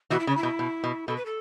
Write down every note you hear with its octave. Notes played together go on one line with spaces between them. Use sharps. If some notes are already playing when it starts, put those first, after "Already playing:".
B2 E3 F#4
E4
C#3 C#4
E4
B2
B2
B2
B2 A4
B4
A4